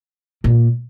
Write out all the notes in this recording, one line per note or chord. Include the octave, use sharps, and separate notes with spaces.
A#2